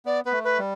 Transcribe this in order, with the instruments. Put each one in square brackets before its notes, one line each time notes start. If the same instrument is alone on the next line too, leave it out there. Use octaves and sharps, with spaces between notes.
[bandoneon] B3 [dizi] D5
[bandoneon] B3 [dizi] B4
[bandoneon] A3
[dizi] B4
[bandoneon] G3